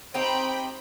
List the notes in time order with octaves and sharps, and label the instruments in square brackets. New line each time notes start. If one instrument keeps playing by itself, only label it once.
[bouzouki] C4 D#4 G4 [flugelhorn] C5 [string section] G5 B5